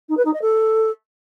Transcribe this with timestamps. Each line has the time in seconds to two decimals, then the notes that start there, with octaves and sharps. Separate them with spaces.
0.09 D#4
0.17 B4
0.25 D#4
0.33 D#5
0.42 A4